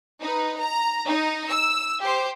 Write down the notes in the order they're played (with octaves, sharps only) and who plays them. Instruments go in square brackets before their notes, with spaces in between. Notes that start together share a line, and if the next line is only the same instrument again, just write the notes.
[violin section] D#4 B4
A#5
D#4
E6
G4 C5